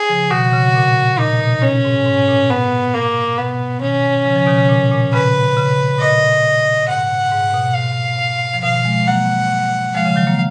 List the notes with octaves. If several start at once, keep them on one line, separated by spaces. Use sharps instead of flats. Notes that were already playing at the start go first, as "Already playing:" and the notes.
Already playing: G#4
C#3 F3
B2 D#3 F#4
C#3
A#2
A#2 D#4
B2
C#4
G#2
G#2
A#2
B3
A#3
B2 B3
B2 D#3 C#4
C#3 F3
C#3 F3
B2 D#3
C#3
A#2
A#2
C#3 B4
C#3
A#2 D#5
G#2 F#5
G#2
B2
F5
F3
B2 D#3 F5
F3 G#3
F#3 A#3 F#5
F3 G#3 F5
C#3 F3
D#3 F#3
F#3 A#3